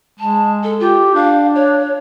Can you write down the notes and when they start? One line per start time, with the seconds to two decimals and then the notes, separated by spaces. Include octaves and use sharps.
0.20 G#3 A5
0.64 A4
0.80 F4 G4
1.15 D4 F5
1.55 C#5